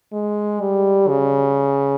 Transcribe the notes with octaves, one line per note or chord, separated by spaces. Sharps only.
G#3
G3
C#3